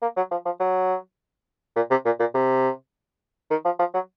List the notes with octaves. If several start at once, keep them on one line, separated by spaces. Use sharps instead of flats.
A#3
F#3
F3
F3
F#3
A#2
C3
A#2
A#2
C3
D#3
F3
F3
F#3